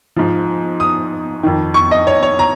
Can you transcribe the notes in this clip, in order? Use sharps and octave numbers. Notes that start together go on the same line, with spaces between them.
G#2 F3
D#6
F2 D#3
C#6
D#5
C#5
C#5
A#5